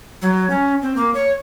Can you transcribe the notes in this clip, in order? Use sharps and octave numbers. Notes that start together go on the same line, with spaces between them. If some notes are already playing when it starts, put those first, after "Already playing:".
F#3
C#4
C4
A#3
C#5